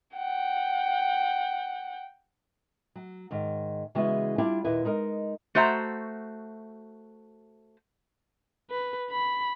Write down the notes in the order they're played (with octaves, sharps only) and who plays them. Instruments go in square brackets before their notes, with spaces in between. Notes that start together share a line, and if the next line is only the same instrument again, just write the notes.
[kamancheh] F#5 G5
[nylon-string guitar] F#3
G#2 D#3
C#3 E3 G#3 B3 E4 F#4
G3 D4 E4 F4 G4 F5
D#2 A#2 E4 B4
G#3 D#4 A#4
[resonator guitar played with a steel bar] A3 F#4 C5 E5 A#5
[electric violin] B4
B5